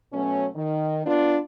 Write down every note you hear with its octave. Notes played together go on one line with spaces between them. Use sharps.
B2 F#3 A3 C#4
D#3
B3 D4 F4